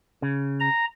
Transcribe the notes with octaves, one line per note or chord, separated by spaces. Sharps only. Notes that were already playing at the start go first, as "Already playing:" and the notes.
C#3
A#5